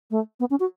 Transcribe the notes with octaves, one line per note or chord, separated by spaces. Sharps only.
A3
B3
C#4
F#4